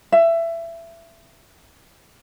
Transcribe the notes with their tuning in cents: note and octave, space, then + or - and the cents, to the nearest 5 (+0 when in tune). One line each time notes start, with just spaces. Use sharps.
E5 +20